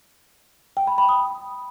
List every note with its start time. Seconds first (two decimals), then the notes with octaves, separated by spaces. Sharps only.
0.77 G5
0.87 B5
0.98 B5
1.09 D#6